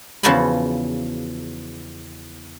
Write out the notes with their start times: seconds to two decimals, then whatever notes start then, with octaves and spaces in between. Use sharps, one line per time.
0.23 E2 C#3 F3 F#4 A5 B5